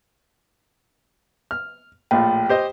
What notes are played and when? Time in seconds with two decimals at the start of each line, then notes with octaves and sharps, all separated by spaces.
1.51 F6
2.11 A#1 A2 F4 G5
2.49 G4 C5 D#5